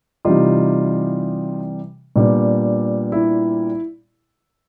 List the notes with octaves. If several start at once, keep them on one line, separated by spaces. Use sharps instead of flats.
C3 E3 G3 D#4 F4
A#2 G3 B3 D4
E4